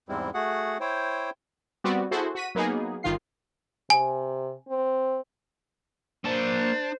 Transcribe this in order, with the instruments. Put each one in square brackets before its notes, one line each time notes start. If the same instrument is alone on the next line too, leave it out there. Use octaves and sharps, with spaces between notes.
[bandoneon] E2 G#2 G3 G#3 C4 E4
A3 F#4 G#4 F#5
E4 C5 C#5 G5
[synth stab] G3 B3 C4 F#4 D5
E4 F#4 G#4 A4 C5
F#4 B6 D#7
F#3 A#3 B3 D#4 G#4
G1 D#3 F4 C7
[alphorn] C3 [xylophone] G#5
[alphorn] C4
[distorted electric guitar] A#3 A5 [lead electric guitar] D4 [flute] C5